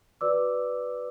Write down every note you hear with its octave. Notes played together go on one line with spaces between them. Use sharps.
F#4 B4 D5 D6 E6